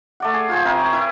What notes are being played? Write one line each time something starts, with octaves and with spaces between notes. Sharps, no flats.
A3 D5 F#5
G#4
F4 C5 G#5
C3 E4 A#4
C#5
E4 B4